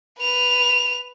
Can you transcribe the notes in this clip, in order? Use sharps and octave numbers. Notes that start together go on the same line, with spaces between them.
B4 F7